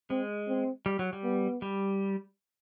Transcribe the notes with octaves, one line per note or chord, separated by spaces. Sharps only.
G#3 C4
C4
G3
F#3
G3
B3
G3